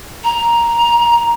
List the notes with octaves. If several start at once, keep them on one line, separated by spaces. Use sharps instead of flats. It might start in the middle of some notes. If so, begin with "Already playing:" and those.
A#5